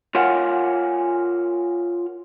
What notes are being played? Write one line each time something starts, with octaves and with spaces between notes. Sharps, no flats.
F4 A#4 C#5 F5 F#5 G#5